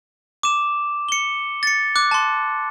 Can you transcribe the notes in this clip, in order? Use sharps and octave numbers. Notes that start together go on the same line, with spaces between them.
D6 E7
C#7 G7
A6 C#7
D6 F#6
A5 C6